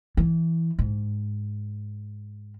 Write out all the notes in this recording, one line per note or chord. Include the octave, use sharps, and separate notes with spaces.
E3
G#2